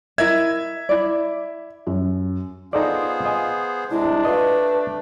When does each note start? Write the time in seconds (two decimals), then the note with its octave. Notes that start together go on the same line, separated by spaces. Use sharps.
0.18 E4 A#4 D#5 E5 G#6
0.89 E4 D5
1.87 F#2
2.73 B3 D#4 F4 G#4 A4 C5 D5
3.25 D#5 G#5
3.91 C3 G#3 D4 E4
4.25 A3 F4 B4 D#5